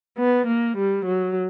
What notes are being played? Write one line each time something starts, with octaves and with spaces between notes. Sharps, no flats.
B3
A#3
G3
F#3